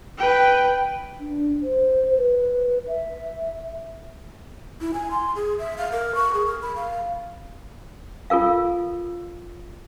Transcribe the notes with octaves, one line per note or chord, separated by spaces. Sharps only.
B4 G5
D4
C5
B4
E5
E4
G#5
C6
G#4
E5
F5
A#4
C#6
G#4
A#4
B5
F5
F4 A4 A#4 F5